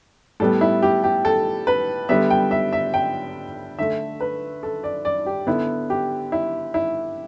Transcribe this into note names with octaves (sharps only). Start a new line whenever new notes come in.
A2 G3 B3 A4
E4
G4
G4
A4
B4
D3 G3 B3 E5
G5
E5
E5
G5
D3 A3 E5
B4
A4
D5
D5
G4
D3 B3 E4
G4
E4
E4